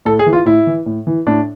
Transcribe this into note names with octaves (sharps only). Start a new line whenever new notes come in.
A2 A4
G#4
E3
F4
A2 E4
E3
A2
E3
A2 D4